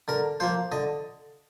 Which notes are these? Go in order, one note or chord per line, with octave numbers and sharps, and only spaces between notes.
D3 A#4
F3 A#3 C5
D3 D#5